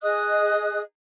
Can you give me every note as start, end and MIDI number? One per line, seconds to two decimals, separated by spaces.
0.03 0.81 68
0.03 0.81 75
0.03 0.81 87
0.03 0.81 90